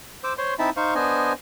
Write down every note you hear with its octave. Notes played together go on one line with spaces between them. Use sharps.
C5 D6 E6
C5 C#5 C6
C4 D#4 E4 E5 A5 B5
D#4 C5 F5 C#6
B3 D4 C5 D#5 G#5